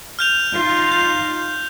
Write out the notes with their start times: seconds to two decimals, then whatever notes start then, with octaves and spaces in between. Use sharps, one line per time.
0.19 F6 G6 F7
0.54 D#4 F4 F5
0.92 G6